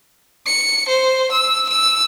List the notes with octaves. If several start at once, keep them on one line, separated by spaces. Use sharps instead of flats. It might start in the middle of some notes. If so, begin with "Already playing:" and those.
C#7
C5
E6
E6